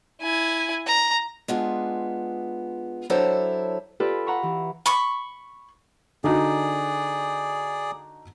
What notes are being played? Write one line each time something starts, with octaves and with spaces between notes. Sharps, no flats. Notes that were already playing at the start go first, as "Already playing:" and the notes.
E4 G#5
A#5
G#3 B3 D4 F4 G#4
F#3 D4 E4 A4 C5 C#5
F4 G4 A4 B4 D5
F#5 A#5 B5 C#6
E3
B5 C#6
D3 D#4 F#4 G#4 D5